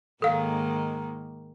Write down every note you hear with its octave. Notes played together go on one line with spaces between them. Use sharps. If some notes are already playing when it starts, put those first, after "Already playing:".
G#2 D#3 A#3 A4 F5